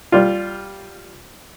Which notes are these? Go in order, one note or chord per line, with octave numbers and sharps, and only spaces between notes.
G3 F4